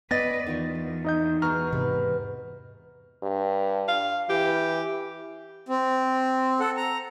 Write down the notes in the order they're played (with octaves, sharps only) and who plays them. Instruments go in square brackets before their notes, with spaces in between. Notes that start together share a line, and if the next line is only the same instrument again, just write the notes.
[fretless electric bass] B3 [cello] B4 D5 [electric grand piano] D#5 A6 A#6
[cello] E2 [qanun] D#3 F4 C#6
[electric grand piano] D#4 D#5 G6
[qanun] B2 G#3 [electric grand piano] A#5 C#6 F6
[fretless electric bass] G#2 C3 [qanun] B4
[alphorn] G2
[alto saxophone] F5
[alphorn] E3 [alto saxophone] G4
[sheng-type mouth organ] C4
A4 F#5
A#5